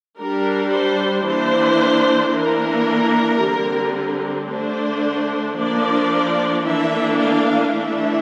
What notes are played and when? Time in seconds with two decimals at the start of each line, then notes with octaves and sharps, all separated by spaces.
0.19 G3 D4 A#4
0.72 C5
1.26 E3 A#3 D4 C5
2.33 E3 A#3 D4 A#4
3.42 D3 G3 C4
4.49 D3 A3 D4 C5
5.57 F3 A#3 D4 D5
6.64 E3 A#3 D4 E5
7.19 F5
7.72 E3 A3 D4 E5